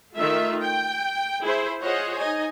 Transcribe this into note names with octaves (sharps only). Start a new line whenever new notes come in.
D#3 A3 F4 E5
G5
E4 G#4 C5
F4 G#4 C5 C#5 D#5 F#5
D#4 D#5 G#5